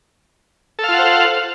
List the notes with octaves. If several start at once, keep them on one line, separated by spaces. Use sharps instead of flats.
F4 A4 C5 F5 F#5